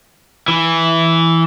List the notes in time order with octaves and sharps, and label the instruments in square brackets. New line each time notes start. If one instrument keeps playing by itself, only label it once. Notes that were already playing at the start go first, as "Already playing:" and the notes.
[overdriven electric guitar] E3